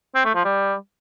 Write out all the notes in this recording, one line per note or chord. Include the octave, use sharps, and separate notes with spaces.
C4
A3
F3
G3